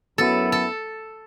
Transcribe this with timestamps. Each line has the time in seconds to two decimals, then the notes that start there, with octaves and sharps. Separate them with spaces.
0.18 F#2 F#3 B3 E4 A4
0.52 A4